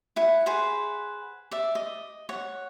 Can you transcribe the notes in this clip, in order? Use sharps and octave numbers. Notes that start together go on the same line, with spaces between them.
E4 F#5
G#4 B4 C5 F#5
D5 E5
D#5
C#5 F#5